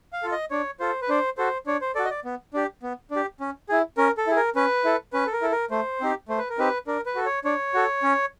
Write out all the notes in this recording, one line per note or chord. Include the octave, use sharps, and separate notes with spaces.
F5
F4 A4
D#5
D4 C#5
F4 A4 C5
B4
D4 C5
F#4 A4 C5
D4 C#5
C5
F#4 A4 D5
D#5
D5
B3
D4 G4
B3
D4
G4
C#4
E4 G#4
C#4 A#4
A4
E4 G#4
A#4
C#4 B4
E4 A4
C#4 B4
A4
A#4
E4 A4
A#4
A3 C5
C4 D#4 G4
A3 C5
B4
A#4
C4 D#4 G4 B4
D4 A#4
B4
F#4 A4
C#5
D4 C#5
F#4 A4
C#4